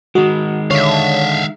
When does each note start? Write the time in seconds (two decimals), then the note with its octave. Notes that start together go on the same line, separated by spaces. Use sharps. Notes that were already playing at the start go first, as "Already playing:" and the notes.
0.15 D#3 G#3 F#4
0.71 D3 C#5 E5 F5